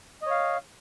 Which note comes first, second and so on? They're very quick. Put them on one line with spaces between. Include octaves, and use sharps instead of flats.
D#5 C#5 F5